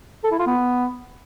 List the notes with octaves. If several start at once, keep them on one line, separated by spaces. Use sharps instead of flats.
A4
E4
F4
B3